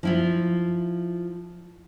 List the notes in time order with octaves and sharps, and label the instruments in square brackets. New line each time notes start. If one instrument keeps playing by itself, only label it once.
[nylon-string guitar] F3 E4 F4